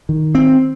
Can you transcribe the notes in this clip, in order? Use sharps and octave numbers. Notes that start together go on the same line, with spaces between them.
D#3
C4